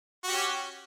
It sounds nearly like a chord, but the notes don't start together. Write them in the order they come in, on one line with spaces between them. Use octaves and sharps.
F#4 G4 C#4